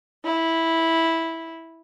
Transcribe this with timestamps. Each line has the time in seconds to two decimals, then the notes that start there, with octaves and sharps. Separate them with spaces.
0.24 E4